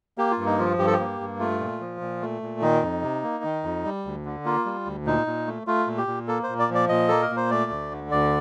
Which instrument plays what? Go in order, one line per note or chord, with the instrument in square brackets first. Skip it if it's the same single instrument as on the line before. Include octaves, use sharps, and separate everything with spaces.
[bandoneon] A#3 G4
F4
G2
D#4
F3 F4
G2 G4
A4
G4
A#3
G2
A3 F4
A#2
F3
A#2
A3
A#2
D#3 D#4
F2
C3
A#3
D#3
F2
G3
D2
D3
A#3 F4
G3
D2
A#2 D#4
A#2
A3
A3 F4
A#2
G4
A#2
A#3 A4
C5
A#2
D5
F3
D5
A#2 D#5
A#3 A4
A#4
A#2
C5
A3 D5
D2
D3
D2 D5